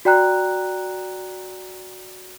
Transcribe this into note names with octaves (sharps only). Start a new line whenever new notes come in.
F#4 D5 G5 A#5 F#6